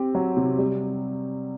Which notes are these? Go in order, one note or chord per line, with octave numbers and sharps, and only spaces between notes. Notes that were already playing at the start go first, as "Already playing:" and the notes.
Already playing: C4 G4
F#3
C3
G3